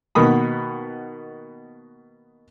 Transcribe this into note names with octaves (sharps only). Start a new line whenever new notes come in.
B2 D#3 A#3 B3 B5 D#6